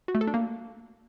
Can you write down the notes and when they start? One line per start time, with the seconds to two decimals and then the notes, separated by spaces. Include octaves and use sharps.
0.08 F#4
0.15 A3
0.21 A4
0.27 D4
0.34 A#3